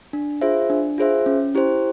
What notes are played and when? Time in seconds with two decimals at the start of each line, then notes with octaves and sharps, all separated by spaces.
0.13 D4
0.41 F4 G#4 C5 E5
0.70 D4
0.98 F4 G#4 C5 E5
1.26 C#4
1.55 E4 G4 C5